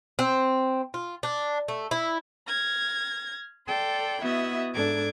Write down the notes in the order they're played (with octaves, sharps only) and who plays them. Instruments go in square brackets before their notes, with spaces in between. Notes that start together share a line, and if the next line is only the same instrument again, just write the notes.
[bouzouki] C4
F4
D4
A3
E4
[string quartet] F6 G#6 A#6
A4 D5 G5 C6
B3 E4 F#4 D#5 E5
G#2 D4 A4 D6 G#6